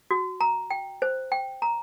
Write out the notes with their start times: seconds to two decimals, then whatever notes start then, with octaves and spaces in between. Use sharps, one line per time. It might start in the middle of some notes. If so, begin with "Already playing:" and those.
0.11 F#4
0.41 A#5
0.70 G5
1.02 C5
1.32 G5
1.62 A#5